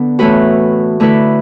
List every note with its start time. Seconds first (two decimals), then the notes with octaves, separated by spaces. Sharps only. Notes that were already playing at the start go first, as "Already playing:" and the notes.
Already playing: D3 B3 D4
0.19 A2 E3 A3 F#4 B4
1.00 D3 A3 E4 B4